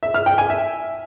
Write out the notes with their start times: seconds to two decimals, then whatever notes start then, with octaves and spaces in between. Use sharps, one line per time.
0.03 E5
0.14 F6
0.26 G5
0.38 G#5
0.50 E5